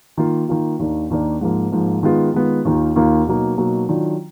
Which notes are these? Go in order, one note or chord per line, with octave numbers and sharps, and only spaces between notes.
D#3 A#3 F4
D#3 A#3 F4
D#2 D#3 A#3 D4
D#2 D#3 A#3 D4
G#2 F3 A#3
G#2 F3 A#3
D#3 G#3 B3 F4
D#3 G#3 B3 F4
D#2 D#3 A#3 F4
D#2 D#3 A#3 F4
B2 F#3 A#3 D#4
B2 F#3 A#3 D#4
D#3 F#3 D4 F4